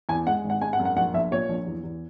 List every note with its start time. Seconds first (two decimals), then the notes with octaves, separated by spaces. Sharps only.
0.09 E2 G#5
0.27 G#3 F#5
0.44 G#1
0.50 F#5
0.61 G#3 G#5
0.73 F#5
0.80 F#2
0.85 F#5
0.96 A#1 F#5
1.14 A#1 E5
1.31 A#2 C#5
1.49 A#1
1.67 E2
1.84 E2